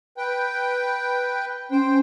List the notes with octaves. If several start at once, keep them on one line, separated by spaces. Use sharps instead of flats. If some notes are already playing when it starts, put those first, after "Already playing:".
B4 G5
C#4 C5 G5